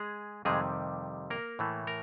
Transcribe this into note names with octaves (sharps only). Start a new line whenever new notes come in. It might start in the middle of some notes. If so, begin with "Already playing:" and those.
Already playing: G#3 G#4
F2 C3 D#3 G3 G#3 G#4
A#3 A#4
A2 E3 A3
A#4